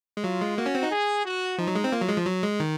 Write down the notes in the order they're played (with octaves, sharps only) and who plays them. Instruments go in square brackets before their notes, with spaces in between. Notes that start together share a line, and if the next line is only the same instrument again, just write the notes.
[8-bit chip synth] G#3
[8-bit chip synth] F#3 [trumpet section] F4
[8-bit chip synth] G#3
[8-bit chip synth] A#3 [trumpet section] F#4
[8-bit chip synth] C#4
C4
D#4
[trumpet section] G#4
F#4
[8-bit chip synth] F3 [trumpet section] D#4
[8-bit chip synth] F#3
G#3
C4
[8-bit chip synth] A#3 [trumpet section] F4
[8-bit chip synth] F#3
G#3
F3
F#3
G#3
D#3